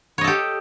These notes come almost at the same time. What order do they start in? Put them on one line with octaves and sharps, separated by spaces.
C#5 D#5 A4 G4